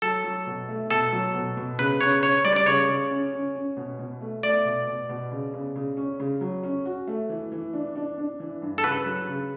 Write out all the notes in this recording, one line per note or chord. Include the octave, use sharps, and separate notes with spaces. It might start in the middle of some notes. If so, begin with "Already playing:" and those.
F#3 A4
F#3
B2
A3
B2 A4
F#3
B2
B2
C#3 B4
C#3 C#5
C#4 C#5
G3 D5
D5
C#3 C#5
C#3
C#4
C#4
C#4
B2
B2
A3
A3 D5
B2
B2
B2
C#3
C#3
C#3
C#4
C#3
F#3
C#4
F#4
A3
E3
E3
D4
D4
D4
E3
G2
A4
C#3 B4
F#3
C#3